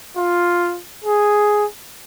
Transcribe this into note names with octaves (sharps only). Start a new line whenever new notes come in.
F4
G#4